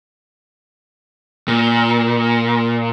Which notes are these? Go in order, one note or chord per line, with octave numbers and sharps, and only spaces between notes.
A#2